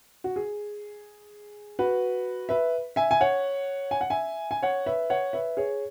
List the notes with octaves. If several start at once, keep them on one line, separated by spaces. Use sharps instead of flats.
F#4
G#4
F#4 B4
B4 E5
E5 G#5
G#5
C#5 F#5
G#5
F#5
E5 G#5
G#5
C#5 F#5
B4 E5
C#5 F#5
B4 E5
G#4 C#5